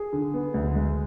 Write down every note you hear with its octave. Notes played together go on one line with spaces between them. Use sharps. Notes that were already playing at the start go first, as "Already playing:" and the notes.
Already playing: G#4
D3
B3
D2
G#3